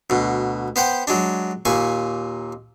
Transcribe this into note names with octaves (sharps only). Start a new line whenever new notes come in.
D2 B2
B3 C5 F#5 G5
F#3 G#3 D4
D#2 A#2 G#5 C#6